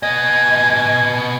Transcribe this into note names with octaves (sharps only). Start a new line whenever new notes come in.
B3 D#5 G#5